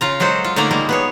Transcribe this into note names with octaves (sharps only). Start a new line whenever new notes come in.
C#3 F4 A#5
F#3 G#3 F#4 A4 C5
F4
D3 A3 A#3 D#4 D5 A#5
G3 G#3 A#3
B3 G#4 C#5